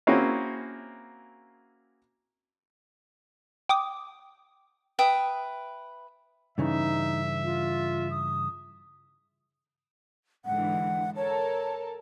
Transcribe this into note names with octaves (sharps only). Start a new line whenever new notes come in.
A#3 C4 C#4 E4 F#4 G#4
G5 D6 D#6
B4 E5 G5 D#6
G2 C#3 E3 D#4 E5
F4
D#6
G#2 D3 E3 F#5
A4 A#4 C#5 A5